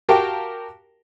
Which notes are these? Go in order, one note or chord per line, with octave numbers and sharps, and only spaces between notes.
F#4 G4 A#4 F5 G5 A5